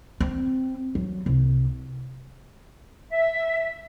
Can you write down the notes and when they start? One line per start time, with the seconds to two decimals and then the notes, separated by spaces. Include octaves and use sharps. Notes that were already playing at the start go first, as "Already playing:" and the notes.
0.20 C4
0.95 F#3
1.26 C2
3.10 E5